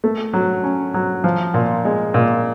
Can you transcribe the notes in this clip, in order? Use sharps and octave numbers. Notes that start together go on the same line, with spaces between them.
A3
F#3
C#4
F#3
F3
A#2
G#3
A#2